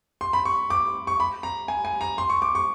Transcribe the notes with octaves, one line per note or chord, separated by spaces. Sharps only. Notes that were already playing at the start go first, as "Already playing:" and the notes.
C6
B5
C#6
D6
C#6
B5
A#5
G#5
G#5
A#5
C6
C#6
D6
C#6